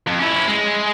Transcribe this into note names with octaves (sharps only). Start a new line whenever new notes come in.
F2
C#4 E4
G#3